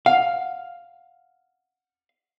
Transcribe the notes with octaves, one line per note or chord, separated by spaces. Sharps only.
F5 F#5